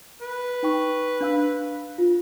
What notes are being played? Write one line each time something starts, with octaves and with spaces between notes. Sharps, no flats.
B4
D#4 G5 C#6
D4 F5 E6
F4